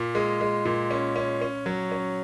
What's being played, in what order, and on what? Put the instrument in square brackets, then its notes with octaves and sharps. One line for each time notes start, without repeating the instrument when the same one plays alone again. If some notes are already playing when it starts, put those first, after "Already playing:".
Already playing: [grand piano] A#2
G#3
G#3
A#2
C#4
C#4
C#4
F#3
C#4